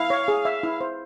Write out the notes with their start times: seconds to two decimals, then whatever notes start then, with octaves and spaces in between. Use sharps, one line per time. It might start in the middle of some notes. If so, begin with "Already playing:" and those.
Already playing: E4 F5
0.10 C#5
0.28 G#4
0.45 E5
0.63 E4
0.81 C5